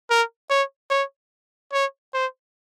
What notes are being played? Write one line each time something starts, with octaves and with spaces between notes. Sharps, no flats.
A#4
C#5
C#5
C#5
C5